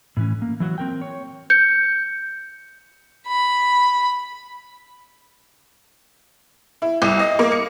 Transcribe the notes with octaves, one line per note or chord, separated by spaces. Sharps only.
A2 E3 C#4
A#3
E3 F#3 F#4
C4 A#4 G5
C#5
G6 C#7
B5
E4
C2
D#5
A#3
C#7